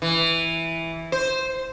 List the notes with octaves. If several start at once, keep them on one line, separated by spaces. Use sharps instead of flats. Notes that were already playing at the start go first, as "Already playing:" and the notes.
E3
C5